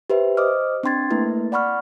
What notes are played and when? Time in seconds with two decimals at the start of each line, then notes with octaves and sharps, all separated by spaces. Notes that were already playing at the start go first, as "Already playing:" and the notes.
0.10 G4 B4 C5 E5
0.37 C5 D#5 D6 D#6 F6
0.83 C4 D4 G5 C6 G#6 A6
1.10 A3 A#3 E4 B4
1.52 D5 F#5 B5 C#6 F6